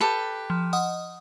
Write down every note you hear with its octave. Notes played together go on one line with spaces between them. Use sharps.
G4 A4 B4
F3
D#5 F#5 D#6